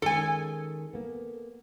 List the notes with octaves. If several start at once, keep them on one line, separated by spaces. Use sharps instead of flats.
D#3 G#3 C#4 A4 G#5
A#3 B3